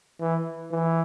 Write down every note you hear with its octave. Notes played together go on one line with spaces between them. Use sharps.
E3
E3